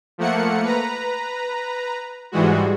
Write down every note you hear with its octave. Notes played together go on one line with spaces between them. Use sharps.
F3 A3 A#3 F#5 C#7
B4 A#5
G#2 E3 G3 G#3 F#4